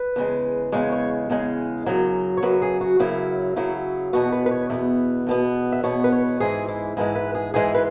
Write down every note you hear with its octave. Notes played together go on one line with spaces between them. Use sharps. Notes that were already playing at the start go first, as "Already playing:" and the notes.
Already playing: B4
E2 C#3 G#3
E2 C#3 G#3 C#5
C#5
E2 C#3 G#3
F#2 C#3 F#3
C#5
F#2 C#3 F#3 B4
G#4
F#4
F#2 C#3 F#3 E4
F#2 C#3 F#3 E4
E2 B2 B3 F#4
B4
B4
C#5
E2 B2 B3 E5
E2 B2 B3
E5
E2 B2 B3 C#5
B4
C#5
G#2 E3 G#3 G#4
E4
G#2 E3 G#3 E4
B4
G#4
G#2 E3 G#3 G#4
B4